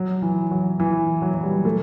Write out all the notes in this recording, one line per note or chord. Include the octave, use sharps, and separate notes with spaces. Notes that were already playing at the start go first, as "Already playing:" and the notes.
Already playing: F#3
E3
F#3
E3
F#3
F#3
G3
A3